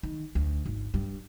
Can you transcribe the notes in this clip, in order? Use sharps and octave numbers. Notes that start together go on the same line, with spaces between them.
D#3
D2
G#1
G2